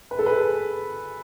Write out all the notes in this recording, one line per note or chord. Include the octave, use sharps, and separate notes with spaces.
B4
A4
G#4 B4